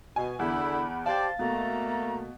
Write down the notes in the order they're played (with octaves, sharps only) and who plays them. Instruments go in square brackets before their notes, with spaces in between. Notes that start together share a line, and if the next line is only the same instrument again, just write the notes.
[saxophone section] B2 [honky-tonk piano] G#5
[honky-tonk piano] E2 [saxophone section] D3 E4 [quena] B5
[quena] G4 [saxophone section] C5 D5 [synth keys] F5 A6 [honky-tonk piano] A5
[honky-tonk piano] B2 [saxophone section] A3 A#3 [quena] A#5